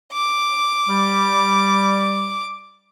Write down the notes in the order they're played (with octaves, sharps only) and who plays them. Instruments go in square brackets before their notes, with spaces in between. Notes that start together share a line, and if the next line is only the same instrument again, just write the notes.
[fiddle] D6
[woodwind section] G3